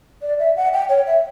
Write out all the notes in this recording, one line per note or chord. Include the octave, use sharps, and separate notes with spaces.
D5
E5
F#5
G5
C#5
E5